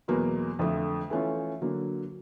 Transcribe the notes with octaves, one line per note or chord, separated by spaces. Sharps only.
E2 B2 F#3 A#3
F2 D3 F3 A3
E3 A3 C#4 F4
D3 F#3 A#3